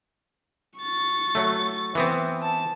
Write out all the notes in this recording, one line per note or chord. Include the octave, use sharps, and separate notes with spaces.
C#6 A6
F#3 A3
E3 B3 C4
A5